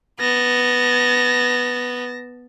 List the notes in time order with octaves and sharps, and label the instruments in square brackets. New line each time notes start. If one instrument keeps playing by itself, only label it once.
[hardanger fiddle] B3 [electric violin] A5 A#6